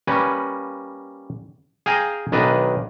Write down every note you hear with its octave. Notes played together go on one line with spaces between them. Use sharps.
G3 A#3 C#4 B4
G#4 F5 G5 G#5 A#5
B1 D#3 D4 B4 D#5